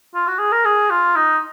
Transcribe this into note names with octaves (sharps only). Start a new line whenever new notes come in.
F4
F#4
G#4
A#4
G#4
F4
D#4